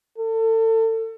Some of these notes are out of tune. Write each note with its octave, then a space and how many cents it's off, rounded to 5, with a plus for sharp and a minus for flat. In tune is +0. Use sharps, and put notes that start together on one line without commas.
A4 +30